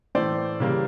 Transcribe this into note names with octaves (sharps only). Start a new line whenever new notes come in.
A2 E3 A3 C5 D5
C#3 E3 G3 A#3